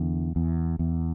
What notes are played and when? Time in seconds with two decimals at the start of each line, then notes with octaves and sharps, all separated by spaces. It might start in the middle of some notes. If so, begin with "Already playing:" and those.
Already playing: E2 D3
0.36 E2
0.79 E2